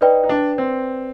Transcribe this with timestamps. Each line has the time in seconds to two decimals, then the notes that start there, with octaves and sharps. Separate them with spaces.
0.01 D#4 B4 D5 G5
0.23 D#4
0.29 D4
0.58 C4